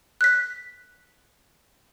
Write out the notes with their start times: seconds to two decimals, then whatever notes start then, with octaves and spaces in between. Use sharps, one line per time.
0.21 F#6 B6